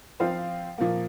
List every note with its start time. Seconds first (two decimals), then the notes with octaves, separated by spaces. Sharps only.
0.20 F3 C4 F4 C5 F5
0.78 A#2 F3 A#3